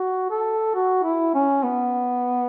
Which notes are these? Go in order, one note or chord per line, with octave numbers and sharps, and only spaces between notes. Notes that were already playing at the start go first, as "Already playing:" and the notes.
Already playing: F#4
A4
F#4
E4
C#4
B3